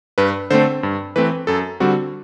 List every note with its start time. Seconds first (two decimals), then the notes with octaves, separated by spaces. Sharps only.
0.18 G2 B4
0.50 D3 A3 C4 C5
0.83 G2
1.16 E3 A3 C4 B4
1.47 F#2 A4
1.80 D3 G3 C4 F#4